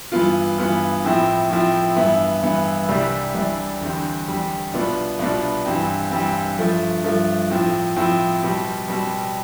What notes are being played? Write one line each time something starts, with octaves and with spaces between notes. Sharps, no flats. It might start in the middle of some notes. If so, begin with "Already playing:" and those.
G2 E3 B3 F4
G2 E3 B3 F4
A2 F3 C4 E4
A2 F3 C4 E4
G2 E3 B3 E4
G2 E3 B3 E4
C2 C3 E3 G3 D4
C2 C3 E3 G3 D4
E2 D3 G3 C4
E2 D3 G3 C4
C2 B2 B3 D4 F4
C2 B2 B3 D4 F4
G2 E3 G3 C4
G2 E3 G3 C4
G2 F3 A3
G2 F3 A3
A2 F3 C4
A2 F3 C4
B2 G3 C4
B2 G3 C4